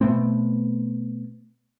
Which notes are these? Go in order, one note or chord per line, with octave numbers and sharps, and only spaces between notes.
B2 A3 B3 C4